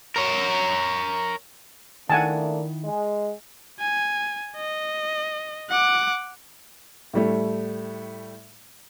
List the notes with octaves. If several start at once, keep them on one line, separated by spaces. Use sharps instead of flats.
A#4 C#5
D#3 A3 A#3 D4 E4 F#5 G#5 A5
G#3
G#5
D#5
F#5 D6
A2 G3 A3